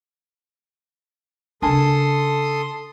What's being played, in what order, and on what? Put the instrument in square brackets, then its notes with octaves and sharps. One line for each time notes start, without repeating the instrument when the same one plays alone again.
[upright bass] C#3 D4 [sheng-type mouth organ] A4 C6 D#6 [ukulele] A#4 G#5 A5